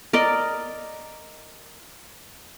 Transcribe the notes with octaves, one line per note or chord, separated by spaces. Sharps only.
A#4 D5 D#5